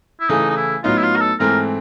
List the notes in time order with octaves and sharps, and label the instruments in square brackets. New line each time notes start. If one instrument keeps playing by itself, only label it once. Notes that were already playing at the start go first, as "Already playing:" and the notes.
[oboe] E4
[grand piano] C#3 E3 A3 [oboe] D#4
[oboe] D#4
E4
[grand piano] A2 F#3 B3 D#4 [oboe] F4
[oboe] E4
F4
A#4
A4
[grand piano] G#2 E3 A3 C4 [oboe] A#4